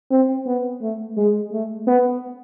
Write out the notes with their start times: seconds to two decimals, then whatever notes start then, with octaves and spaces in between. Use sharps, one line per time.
0.11 C4
0.46 B3
0.82 A3
1.17 G#3
1.52 A3
1.87 B3